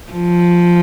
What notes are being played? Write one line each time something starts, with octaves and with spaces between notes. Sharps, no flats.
F3